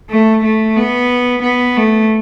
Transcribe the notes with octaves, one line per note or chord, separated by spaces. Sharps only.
A3
A3
B3
B3
A3